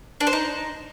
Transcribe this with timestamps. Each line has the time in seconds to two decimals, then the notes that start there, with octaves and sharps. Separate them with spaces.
0.21 D4
0.27 C5
0.33 D#4